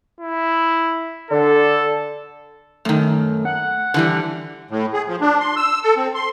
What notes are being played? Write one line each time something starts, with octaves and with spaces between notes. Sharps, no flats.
E4
D3 A4
F#2 D#3 A3
F#5
D3 E3 G3
A2
G#4
F3
D4
C6
E6
A4
C4
C6